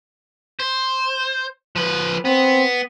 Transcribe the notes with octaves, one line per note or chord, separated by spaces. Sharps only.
C5
F3 B4
B3 C4